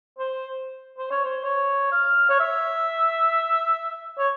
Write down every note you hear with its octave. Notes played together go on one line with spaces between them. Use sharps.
C5
C5
C#5
C5
C#5
F5
C#5
E5
C#5